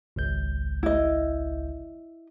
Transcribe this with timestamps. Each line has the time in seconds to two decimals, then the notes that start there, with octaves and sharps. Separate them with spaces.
0.16 G#1 C#2 G6
0.83 E4 D#5